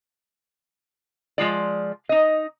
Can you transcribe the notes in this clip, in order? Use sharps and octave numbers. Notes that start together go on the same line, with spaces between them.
F3 G#3 F4 D5
D#4 D#5